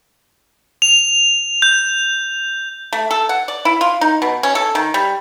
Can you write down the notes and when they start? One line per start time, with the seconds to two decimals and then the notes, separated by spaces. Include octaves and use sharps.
0.82 F7
1.62 G6
2.93 A3
3.11 A4
3.29 F#5
3.48 D5
3.65 E4
3.81 F4
4.01 D#4
4.22 B2
4.43 C#4
4.55 A4
4.75 D#3
4.94 G3